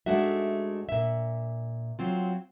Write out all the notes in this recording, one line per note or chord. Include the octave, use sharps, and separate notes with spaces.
G#2 G#3 A3 D4 F#4 E5
A#2 E5
F#3 C4 F4